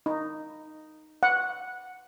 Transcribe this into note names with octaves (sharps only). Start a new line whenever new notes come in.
D#4
F#5